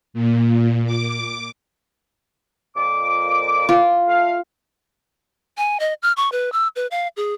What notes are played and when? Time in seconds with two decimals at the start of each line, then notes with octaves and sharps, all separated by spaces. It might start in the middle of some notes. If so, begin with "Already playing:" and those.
0.14 A#2
0.86 D6
2.76 F2 A#2 D6
3.69 F4
4.08 A3 F5
5.58 G#5
5.80 D#5
6.02 F6
6.17 C#6
6.32 B4
6.52 E6
6.76 B4
6.91 F5
7.17 G#4